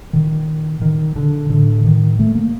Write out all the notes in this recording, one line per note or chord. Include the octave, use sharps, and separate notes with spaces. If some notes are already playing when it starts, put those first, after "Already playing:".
A#2 D#3
A#2 D#3
D3
A2 D3
D#3
A#2 A3
A#3